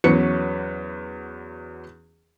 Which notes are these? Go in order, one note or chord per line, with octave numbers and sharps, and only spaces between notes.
E2 F#3 C#4 B4 C#7